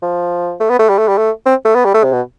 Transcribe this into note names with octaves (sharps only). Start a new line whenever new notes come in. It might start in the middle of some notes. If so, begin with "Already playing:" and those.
F3
A3
B3
A3
G3
A3
G3
A3
C4
A3
B3
G3
A3
C3
B2